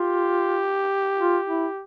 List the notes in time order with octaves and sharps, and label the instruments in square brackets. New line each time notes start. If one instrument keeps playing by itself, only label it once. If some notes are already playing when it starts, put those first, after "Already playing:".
Already playing: [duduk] F4 [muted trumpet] G4
[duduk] F4
E4